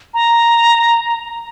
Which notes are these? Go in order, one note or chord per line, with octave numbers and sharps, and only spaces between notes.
A#5